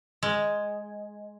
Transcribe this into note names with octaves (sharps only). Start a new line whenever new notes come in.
G#3